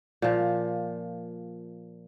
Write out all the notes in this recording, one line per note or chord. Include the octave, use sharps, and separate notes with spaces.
A#2 F3